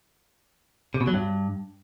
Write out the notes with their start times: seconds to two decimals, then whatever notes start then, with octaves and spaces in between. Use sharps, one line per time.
0.94 C3
1.01 B2
1.07 F#3
1.14 G2